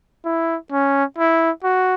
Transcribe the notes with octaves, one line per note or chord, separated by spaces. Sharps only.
E4
C#4
E4
F#4